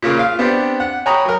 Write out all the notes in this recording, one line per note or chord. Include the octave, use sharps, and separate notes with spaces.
A#2 C#3 A#3 F5
F4 F5
B3 C4 D4 G4
F#5
C#5 G5 G#5 A#5 B5 D#6
F#3 A#4